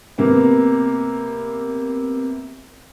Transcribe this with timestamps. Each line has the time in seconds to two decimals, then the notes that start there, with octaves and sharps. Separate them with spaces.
0.18 C3 A#3 B3